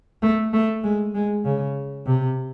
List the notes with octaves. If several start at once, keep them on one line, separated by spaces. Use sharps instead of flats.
A3
A3
G#3
G#3
C#3
C3